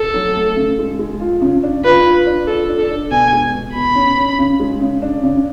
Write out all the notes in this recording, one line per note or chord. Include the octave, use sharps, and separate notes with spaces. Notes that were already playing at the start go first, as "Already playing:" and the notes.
Already playing: A4
F#3
A3
C#3
G#3
G#3
F4
C#3
D4
F4 B4
F4
D4
F4 A4
D4
A4
D4
B2 G#5
G#3
B2
B2 B5
C#4
C#4
C#3
G#3
C#3
D4
C#3